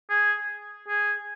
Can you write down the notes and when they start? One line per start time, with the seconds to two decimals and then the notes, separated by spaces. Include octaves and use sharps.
0.10 G#4
0.89 G#4